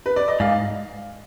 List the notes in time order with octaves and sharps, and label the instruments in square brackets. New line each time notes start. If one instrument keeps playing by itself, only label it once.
[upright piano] B4
D5
D#5
[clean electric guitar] G#2 [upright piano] F5